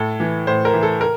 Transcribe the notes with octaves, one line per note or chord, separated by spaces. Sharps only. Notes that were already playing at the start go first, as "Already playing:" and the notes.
Already playing: A2 A4
E3
A2 C5
A#4
E3
A4
A#4